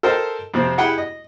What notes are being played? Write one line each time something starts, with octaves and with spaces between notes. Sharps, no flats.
A4 A#4 C5 D#5 G5 A5
F2 C3 C4
E4 G4 G#4 F#5 G5 B5
D#5